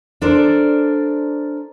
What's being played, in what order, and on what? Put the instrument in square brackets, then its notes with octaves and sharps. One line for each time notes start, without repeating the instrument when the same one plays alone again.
[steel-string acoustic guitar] D4 A4 A#4 C5 D5